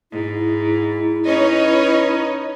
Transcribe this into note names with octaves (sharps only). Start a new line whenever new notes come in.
G#2 E4
C#4 D#4 B4 C#5 D#5